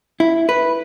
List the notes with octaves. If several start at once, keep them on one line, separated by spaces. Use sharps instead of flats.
E4
B4